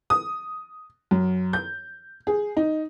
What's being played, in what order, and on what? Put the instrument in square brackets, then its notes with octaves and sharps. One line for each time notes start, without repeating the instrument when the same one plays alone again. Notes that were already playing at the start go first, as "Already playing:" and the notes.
[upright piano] D#6
F#2
G6
G#4
D#4